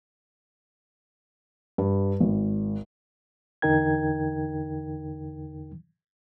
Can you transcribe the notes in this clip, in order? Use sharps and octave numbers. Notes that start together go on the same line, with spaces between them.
G2
G#1
E2 D3 D#4 A#4 G5 G#6